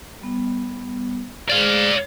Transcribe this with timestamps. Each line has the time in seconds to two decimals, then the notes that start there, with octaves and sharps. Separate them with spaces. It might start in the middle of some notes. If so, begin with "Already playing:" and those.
0.22 G3 B3
1.50 G#3 G#4 C5 D5 F5